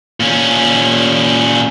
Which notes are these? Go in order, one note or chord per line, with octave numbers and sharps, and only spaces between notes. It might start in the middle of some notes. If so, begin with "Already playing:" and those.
A#2 C#4